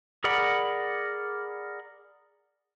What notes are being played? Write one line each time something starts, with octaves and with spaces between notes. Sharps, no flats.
G#4 A#4 D5 F#5 B5